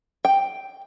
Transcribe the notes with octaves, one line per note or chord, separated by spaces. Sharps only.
G5